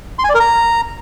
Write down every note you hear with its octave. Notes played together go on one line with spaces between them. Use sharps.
C6
G#5
D5
A#4
A#5